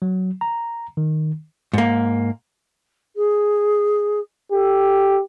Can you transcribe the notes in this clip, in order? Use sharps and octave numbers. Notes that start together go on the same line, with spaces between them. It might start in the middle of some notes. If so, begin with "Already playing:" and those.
F#3
A#5
D#3
G#2 A#3
G#4
G4 A4